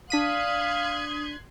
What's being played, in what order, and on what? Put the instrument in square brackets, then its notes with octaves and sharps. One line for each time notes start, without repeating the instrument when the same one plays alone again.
[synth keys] D4 B6 D#7 [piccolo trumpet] F5 [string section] C6 F#6 G#6 [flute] D#6